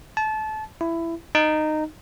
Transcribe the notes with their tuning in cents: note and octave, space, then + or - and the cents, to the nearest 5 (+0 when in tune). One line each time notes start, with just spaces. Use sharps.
A5 -25
E4 +15
D#4 -15